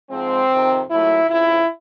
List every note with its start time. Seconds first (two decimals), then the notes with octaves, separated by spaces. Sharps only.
0.10 G#2 F3 G#3 C4
0.50 F2 C3 D#3
0.90 A#2 F#3 A3 E4
1.29 F2 C#3 F3 E4